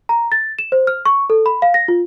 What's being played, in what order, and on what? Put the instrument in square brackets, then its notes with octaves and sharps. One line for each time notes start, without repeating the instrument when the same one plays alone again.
[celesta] A#5
A6
E7
C5
F6
C#6
A4
B5
F5
A#6
F4